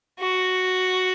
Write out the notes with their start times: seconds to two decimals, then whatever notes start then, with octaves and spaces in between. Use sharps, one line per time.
0.20 F#4